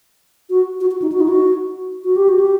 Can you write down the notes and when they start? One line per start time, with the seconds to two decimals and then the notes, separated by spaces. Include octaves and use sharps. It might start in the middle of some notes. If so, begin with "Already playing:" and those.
0.50 F#4
0.81 F#4
0.91 F#4
1.02 D#4
1.12 F#4
1.21 D#4
1.28 F#4
2.04 F#4
2.16 G4
2.29 F#4
2.40 G4